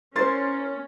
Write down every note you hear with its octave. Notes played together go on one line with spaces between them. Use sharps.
C#4 E4 A#4 C5 C6 A6